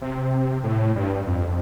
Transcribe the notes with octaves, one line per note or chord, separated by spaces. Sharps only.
C3
A2
G2
F2